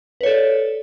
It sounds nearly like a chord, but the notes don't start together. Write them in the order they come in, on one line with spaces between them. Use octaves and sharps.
B4 C#5 A4 D5